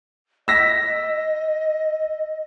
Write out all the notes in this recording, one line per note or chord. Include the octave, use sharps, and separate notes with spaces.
D#5 E6 A#6 B6